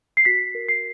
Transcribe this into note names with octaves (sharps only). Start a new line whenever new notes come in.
C7
F#4 B6
A#4
C7